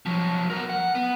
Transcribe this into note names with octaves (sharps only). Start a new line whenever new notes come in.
F3 F#3
B3 A#4
F#5
B3